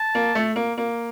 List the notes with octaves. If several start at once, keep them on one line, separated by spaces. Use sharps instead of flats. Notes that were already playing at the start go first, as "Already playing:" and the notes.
Already playing: A5
A#3
A3
A#3
A#3